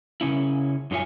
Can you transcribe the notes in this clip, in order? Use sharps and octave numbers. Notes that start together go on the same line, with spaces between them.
C#3 C#4 E4
F#2 D#4 F4 C#5 E5 G#5